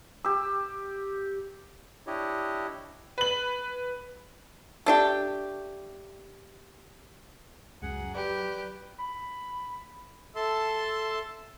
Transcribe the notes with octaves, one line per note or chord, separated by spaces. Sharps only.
G4 E6
D4 E4 G4 C#5 D#5
B4 F#7
A3 D4 G4
C#2 F#2 F#3 G#4 F#5
G4 B4 D5
B5
A4 E5 A5 C6